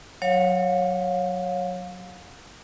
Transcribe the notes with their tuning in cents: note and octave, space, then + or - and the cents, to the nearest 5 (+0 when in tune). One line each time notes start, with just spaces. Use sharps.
F#3 +0 C#5 -10 F5 +25